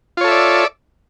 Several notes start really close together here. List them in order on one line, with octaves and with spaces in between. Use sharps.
F4 C#5 A4 E5 D5